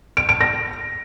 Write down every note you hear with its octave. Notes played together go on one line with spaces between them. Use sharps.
D7
D7
A#6